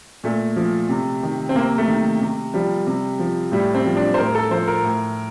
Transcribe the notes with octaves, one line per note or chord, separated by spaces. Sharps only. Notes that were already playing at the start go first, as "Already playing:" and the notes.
A#2 A3
F3
C3
D#3
C4
C3 A#3
A3
D#3
C3
F3 G3
C3
F3
A2 G3
C4
F3
D4
C5
A2 A#4
A4
F3 C5
A#4
A2